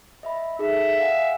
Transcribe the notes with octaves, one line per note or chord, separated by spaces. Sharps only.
D#5 E5 B5
D#4 G#4 A4 E5
F5 F#5 G#5